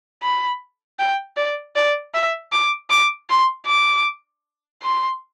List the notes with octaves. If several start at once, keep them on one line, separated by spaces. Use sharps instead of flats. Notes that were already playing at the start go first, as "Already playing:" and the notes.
B5
G5
D5
D5
E5
D6
D6
C6
D6
C6